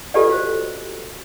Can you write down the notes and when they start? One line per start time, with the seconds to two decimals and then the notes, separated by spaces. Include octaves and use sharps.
0.14 F4 G4 A4 B4 D5 D#5
0.30 F#4 C5